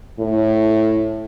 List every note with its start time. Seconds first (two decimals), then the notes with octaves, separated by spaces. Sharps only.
0.19 A2